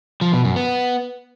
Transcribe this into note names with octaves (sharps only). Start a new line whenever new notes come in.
F3
B2
F#2
B3